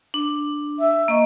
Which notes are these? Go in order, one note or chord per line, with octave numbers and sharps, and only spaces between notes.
D4
E5
A#3 D#5 C#6